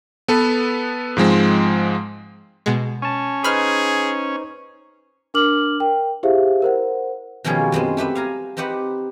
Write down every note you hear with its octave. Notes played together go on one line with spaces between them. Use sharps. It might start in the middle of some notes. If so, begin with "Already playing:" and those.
B3 A4 B4
G#2 F3 G#3 C4
B2 G#3
C#4 G#5 A5
D#4 G#4 B4 C5 B5 F6
D4 A#4 D6 F6 F#7
A#4 G5
E4 G4 G#4 C5 E5 F5
A#4 C5 F#5
B2 D#3 F3 G3 C#4 G#4
F#2 G#3 B3 C4
A3 G4 B4 E5
F5 G#5 A#5
C4 D#4 G4 B4 F#5